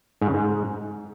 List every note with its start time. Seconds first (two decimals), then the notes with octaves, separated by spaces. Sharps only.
0.21 G#2
0.28 C#3
0.34 G#2